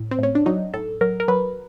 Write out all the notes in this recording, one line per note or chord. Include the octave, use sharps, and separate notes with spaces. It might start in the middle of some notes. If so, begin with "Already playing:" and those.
Already playing: A2
C4
A2 C#4
D4
F#3 D#4
A2 A4
F#3 A#4
A#4
F#3 B4